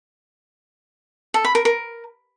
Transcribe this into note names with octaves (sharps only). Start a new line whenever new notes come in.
A4
B5
A#4
A#4